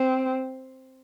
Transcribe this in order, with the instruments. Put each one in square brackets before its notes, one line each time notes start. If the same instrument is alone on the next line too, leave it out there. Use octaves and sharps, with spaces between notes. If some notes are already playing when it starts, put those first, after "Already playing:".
Already playing: [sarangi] C4